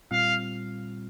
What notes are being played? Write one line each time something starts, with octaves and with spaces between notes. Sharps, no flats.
A#2 G3 C4 F4 F5